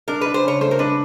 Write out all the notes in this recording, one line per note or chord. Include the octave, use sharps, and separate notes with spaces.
D4 A#4
D4 B4
C5
C#3 C#5
A3 C5
A#4
D4 B4